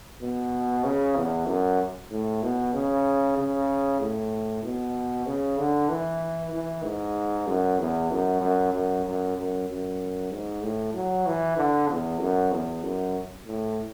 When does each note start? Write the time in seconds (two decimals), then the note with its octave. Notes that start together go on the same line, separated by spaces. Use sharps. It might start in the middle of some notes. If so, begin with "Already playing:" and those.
0.21 B2
0.84 C#3
1.16 E2
1.47 F#2
2.11 A2
2.43 B2
2.74 C#3
3.37 C#3
4.00 A2
4.63 B2
5.27 C#3
5.58 D3
5.89 E3
6.52 E3
6.84 G#2
7.47 F#2
7.79 E2
8.11 F#2
8.41 F#2
8.73 F#2
9.05 F#2
9.37 F#2
9.69 F#2
10.31 G#2
10.63 A2
10.94 F#3
11.26 E3
11.57 D3
11.89 E2
12.21 F#2
12.52 E2
12.84 F#2
13.46 A2